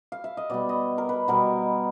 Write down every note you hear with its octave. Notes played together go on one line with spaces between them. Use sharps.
F5
E5
D#5
B2 G3 B3 D5
D#5
A#4
B4
B2 G3 B3 A#4